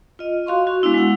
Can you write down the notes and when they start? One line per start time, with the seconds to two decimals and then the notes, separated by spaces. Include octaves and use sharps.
0.19 F4 D#5
0.46 F#4 F5 C6 C#6
0.67 F#4
0.82 G#3 B3 D4 E4 F#4
0.94 G#3 F#5